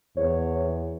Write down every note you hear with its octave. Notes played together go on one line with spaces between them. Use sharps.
E2 C#5